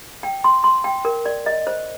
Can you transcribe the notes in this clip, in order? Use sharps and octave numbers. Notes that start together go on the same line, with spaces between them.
G5
C6
C6
G5
A#4
D5
D#5
C5